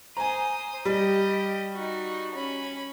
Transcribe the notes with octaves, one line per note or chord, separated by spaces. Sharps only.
C5 G#5 A#5 D#6
G3 G4 D#5
D#4 F#4
C#4 B5